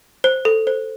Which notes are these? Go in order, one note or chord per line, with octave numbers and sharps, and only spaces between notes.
C5
A4
C5